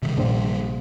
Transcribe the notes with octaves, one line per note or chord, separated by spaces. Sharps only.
C3 D#3 G3
A#1 C5